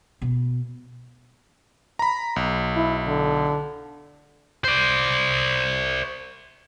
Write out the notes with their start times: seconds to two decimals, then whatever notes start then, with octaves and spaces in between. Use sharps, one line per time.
0.22 B2
1.99 A#5 B5
2.36 B1
2.76 E4
3.07 D3
4.64 C5 D5